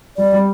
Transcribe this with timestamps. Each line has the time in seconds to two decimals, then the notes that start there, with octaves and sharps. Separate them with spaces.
0.17 G3 D5
0.33 G3